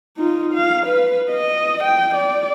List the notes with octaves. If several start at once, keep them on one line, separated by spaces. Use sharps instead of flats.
D#4 F4
F5
B4
D#5
G5
D5